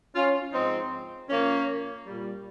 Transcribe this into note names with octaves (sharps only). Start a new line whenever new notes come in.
C#4 F4
G#2 F3 C4 D#4
A#2 F3 A#3 C#4
A#2 G3